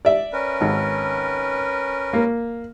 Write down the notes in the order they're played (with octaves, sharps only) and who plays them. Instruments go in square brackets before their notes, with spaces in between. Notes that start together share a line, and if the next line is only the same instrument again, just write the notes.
[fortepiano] D5 E5
[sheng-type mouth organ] C#4 A#4 B4
[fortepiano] G#1
A#3